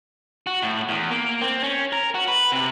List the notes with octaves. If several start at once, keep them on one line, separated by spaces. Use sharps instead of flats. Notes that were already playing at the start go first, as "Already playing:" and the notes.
F#4
A2
E2
A#3
C4
C#4
A#4
F#4
B4
C3